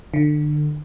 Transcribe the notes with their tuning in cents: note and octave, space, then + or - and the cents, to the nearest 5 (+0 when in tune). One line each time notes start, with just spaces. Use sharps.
D3 +30